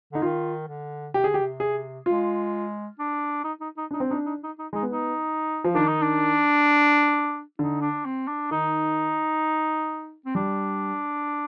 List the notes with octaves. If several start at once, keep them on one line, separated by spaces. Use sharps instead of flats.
D3 D#4
D#3 F4
D3
C3 G4
D3 G#4
G4
C3
G#4
G#3 F4
D4
D#4
D#4
D#4
D4 D#4
C4
D4 D#4
D#4
D#4
D#4
G#3 D#4
B3
D#4
F3
D#3 D4
D#4
D4
D3 D#4
D4
C4
D4
D#3 D#4
C4
G3 D4